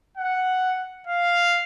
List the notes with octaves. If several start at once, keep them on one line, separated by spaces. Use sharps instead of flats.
F#5
F5